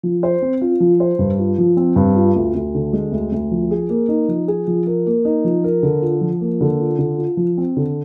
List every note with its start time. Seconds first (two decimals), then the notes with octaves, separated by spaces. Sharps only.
0.03 F3
0.23 C5
0.42 C4
0.62 F4
0.80 F3
1.00 C5
1.19 G2
1.39 F4
1.58 F3
1.77 C4
1.96 G2
2.16 F4
2.36 D2
2.55 D2
2.74 D3
2.93 G#3
3.12 D2
3.32 D2
3.51 F3
3.71 G#4
3.90 A#3
4.09 D#4
4.28 F3
4.48 G#4
4.67 F3
4.86 A#4
5.06 A#3
5.25 D#4
5.44 F3
5.64 A#4
5.83 D3
6.02 F4
6.21 F3
6.41 A#3
6.61 D3
6.80 F4
6.98 D3
7.18 F4
7.37 F3
7.58 C4
7.77 D3